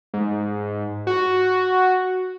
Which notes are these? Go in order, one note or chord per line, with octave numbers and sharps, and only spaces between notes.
G#2
F#4